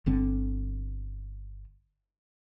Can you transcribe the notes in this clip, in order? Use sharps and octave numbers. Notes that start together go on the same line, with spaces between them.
G1 D3 C4